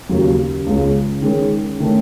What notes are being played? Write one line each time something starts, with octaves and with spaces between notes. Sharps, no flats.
D#2 C#3 F#3
C#2 C#3 G#3 C#4
D#3 G#3 C#4
D#3 A3 C#4